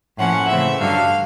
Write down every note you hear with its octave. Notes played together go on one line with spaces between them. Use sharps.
A2 F3 A#3 C#4 F#5
C#3 E3 A3 C4 E5
G2 D3 F#3 F5